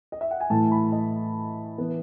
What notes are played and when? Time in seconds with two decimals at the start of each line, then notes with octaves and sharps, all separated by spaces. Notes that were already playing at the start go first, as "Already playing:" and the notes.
0.12 D#5
0.21 E5
0.31 F#5
0.40 G#5
0.50 A2 E3 A3 A5
0.71 B5
0.92 D#5
1.78 E3 B3